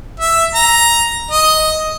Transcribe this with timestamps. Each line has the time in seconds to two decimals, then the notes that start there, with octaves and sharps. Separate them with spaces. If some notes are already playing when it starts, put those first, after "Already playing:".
0.20 E5
0.55 A#5
1.31 D#5